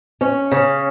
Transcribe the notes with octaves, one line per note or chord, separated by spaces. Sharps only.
C#4
C#3